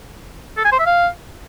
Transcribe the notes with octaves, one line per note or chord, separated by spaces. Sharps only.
A4
G#5
C5
E5
F5